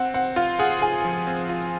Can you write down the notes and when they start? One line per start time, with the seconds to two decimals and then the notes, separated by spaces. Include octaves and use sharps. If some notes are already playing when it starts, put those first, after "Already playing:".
Already playing: C4 F#5
0.14 C4 F#5
0.36 F4 F5
0.59 G#4 F#5
0.81 G#4 G#5
1.05 F3
1.27 C4
1.49 F4